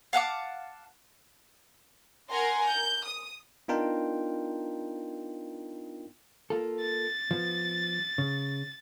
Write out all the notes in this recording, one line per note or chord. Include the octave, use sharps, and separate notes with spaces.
F5 F#5 A5 D6
A#4 F#5 G#5 A#5 C6
G6
D#6
B3 D4 D#4 F4 A#4 G5
A#3 F4 A4
A6
F3 B3
C#3